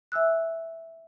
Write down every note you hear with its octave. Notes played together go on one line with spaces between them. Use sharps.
E5 G#5 E6 F#6